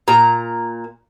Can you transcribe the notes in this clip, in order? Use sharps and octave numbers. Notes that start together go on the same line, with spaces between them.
A#2 A#5